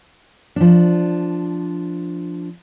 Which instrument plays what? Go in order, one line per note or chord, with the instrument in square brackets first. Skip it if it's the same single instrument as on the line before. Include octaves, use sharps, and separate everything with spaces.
[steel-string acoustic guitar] F3 D4